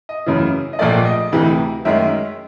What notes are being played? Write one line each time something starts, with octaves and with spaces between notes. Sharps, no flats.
D#5
F#2 C#3 E3
D#5
A#1 A#2 F3 A3 D5
D#5
D2 C3 E3
F#2 D#3 G#3 E5